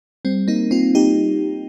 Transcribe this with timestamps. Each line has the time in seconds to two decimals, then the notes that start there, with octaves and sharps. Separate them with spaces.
0.25 G3 C4
0.48 A#3 D#4
0.71 C4 F4
0.95 D#4 G4